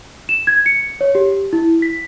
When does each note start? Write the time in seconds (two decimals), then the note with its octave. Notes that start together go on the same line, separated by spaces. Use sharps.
0.29 E7
0.47 G#6
0.66 C#7
1.01 C#5
1.15 G4
1.53 E4
1.82 B6